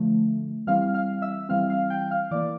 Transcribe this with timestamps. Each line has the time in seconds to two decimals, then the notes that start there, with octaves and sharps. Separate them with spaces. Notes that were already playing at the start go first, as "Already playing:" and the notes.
Already playing: D3 F3 A3
0.67 E3 G3 C4 F5 F6
0.94 F5 F6
1.22 E5 E6
1.49 E3 G3 C4 F5 F6
1.70 F5 F6
1.90 G5 G6
2.11 F5 F6
2.31 E3 A#3 D5 D6